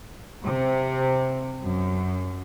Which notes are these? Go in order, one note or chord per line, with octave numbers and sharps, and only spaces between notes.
C3
F#2